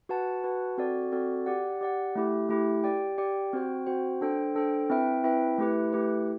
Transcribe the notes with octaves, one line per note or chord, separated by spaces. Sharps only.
F#4 B4 F#5 A5
F#4 B4 F#5 A5
C4 F#4 A4 D5
C4 F#4 A4 D5
G4 D5 F#5
G4 D5 F#5
A3 E4 G4
A3 E4 G4
G4 D5 G5
G4 D5 G5
C4 F#4 C5 G5
C4 F#4 C5 G5
D4 A4 C5 G5
D4 A4 C5 G5
C4 E4 B4 E5 G5
C4 E4 B4 E5 G5
A3 E4 G4 B4
A3 E4 G4 B4